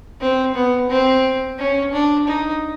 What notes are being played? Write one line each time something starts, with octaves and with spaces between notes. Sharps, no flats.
C4
B3
C4
C#4
D4
D#4